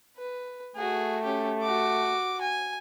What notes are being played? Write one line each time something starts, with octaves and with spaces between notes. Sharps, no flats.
B4
A3 F#4 G#4
C#4 G4
F#4 D6
G#5